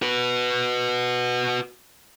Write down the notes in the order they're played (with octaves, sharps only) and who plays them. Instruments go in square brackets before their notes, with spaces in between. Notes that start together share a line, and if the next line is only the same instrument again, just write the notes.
[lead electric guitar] F#4 B4